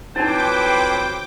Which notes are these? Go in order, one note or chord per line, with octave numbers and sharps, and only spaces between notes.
F2 F#3 D#4 E4 B4 C5 G5 D6